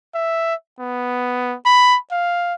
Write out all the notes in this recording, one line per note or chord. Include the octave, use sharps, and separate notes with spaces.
E5
B3
B5
F5